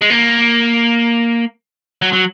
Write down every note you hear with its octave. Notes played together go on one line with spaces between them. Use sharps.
G#3
A#3
F#3
F#3